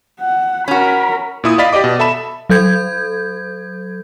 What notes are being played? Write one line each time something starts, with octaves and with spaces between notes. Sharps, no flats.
F#5
C#4 F#4 A#4 B5
A#2 E4 D#6
D5 D#5 F5 B5 A6 B6
G4 D5 D#5 D6
B2
A4 E5 A5 B5 E7
F#3 A4 G6 G#6